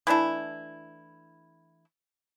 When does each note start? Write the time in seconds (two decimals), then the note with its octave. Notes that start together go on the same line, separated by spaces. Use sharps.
0.07 E3 A3 D4 E4